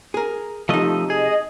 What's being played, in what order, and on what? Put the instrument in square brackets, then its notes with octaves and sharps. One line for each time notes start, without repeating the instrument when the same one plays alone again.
[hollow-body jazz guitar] G#4 A#4
[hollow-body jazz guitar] C3 D#4 [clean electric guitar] F3 A3 D#5
[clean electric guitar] G#4 [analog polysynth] D#5